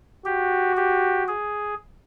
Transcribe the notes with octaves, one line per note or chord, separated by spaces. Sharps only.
F#4 G4
G4
G#4